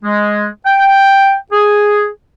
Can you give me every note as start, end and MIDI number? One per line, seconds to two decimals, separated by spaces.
0.04 0.47 56
0.66 1.35 79
1.52 2.09 68